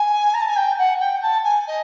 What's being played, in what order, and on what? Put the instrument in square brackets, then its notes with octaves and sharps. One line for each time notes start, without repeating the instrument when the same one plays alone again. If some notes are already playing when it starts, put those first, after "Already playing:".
Already playing: [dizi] G#5
A#5
A5
G#5
G5
F#5
G5
A5
G#5
D#5